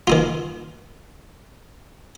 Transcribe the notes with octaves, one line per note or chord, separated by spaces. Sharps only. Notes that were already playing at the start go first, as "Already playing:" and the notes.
D#3 D#4 F4